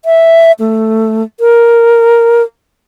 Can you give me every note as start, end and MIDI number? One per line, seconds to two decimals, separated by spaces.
0.05 0.52 76
0.60 1.23 57
1.40 2.42 70